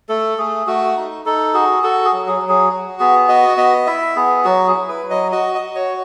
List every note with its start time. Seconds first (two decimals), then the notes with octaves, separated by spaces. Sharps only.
0.09 A3 A4
0.38 A3 G#4
0.67 A3 F#4
0.96 D#4
1.26 D#4 A4
1.54 F#4 G#4
1.83 F#4 A4
2.05 G#4
2.13 F#3
2.27 G#4
2.42 F#3
2.49 G#4
2.70 F#4
2.99 B3 G#4
3.28 F#4 D#5
3.57 B3 D#5
3.87 E4 E5
4.16 B3 G#4
4.45 F#3 F#4
4.67 G#4
4.74 E4
4.89 B4
5.03 F#3
5.10 D#5
5.32 F#4 D#5
5.55 D#5
5.61 F#4
5.75 C#5